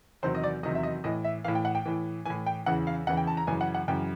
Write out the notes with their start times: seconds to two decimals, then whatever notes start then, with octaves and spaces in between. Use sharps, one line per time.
0.23 E2 C3 D#3 F#3 C5
0.35 D#5
0.44 D5
0.63 E2 C3 D#3 F#3 D#5
0.75 E5
0.83 D#5
1.04 A2 E3 D#5
1.24 E5
1.44 A2 E3 F5
1.55 G5
1.65 F#5
1.75 G5
1.85 A2 E3
2.25 A2 E3 G#5
2.46 G5
2.66 E2 C#3 E3 F#5
2.87 F5
3.07 E2 C#3 E3 F#5
3.17 G5
3.27 A5
3.37 A#5
3.47 F#2 C#3 E3 G#5
3.61 F#5
3.75 F#5
3.88 F#2 C#3 E3 G5